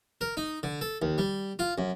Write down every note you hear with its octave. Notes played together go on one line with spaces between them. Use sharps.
A#4
D#4
D3
A4
D#2
G3
F4
F#2